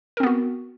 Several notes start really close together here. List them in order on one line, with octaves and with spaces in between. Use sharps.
A#4 C4 B3 F#4